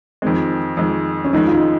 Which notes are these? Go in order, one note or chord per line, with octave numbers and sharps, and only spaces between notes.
F2 D#3 G#3 C4
F2 D#3 G#3
C#4
F2 D#3 G#3 D#4
F4
D#4